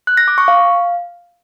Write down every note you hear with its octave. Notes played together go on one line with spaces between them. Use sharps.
F#6
A#6
D6
C#6
F5